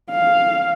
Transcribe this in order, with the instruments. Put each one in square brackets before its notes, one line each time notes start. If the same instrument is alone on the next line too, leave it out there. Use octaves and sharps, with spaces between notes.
[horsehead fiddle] F5